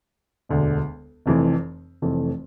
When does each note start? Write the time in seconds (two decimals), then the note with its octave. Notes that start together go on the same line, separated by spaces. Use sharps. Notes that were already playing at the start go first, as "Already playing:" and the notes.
0.49 E1 D2 D3
1.26 F1 F2 E3 A3
2.02 F1 F2 E3 A3